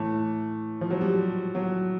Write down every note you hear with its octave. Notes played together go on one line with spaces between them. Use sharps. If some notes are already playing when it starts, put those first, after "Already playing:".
Already playing: A2 E3 A3
F3
F#3
G3
F#3